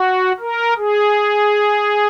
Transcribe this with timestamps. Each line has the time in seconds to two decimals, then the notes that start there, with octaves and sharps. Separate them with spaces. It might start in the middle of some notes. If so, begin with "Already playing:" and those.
Already playing: F#4
0.40 A#4
0.77 G#4